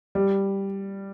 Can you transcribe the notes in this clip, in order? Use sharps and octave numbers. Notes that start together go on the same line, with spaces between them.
G3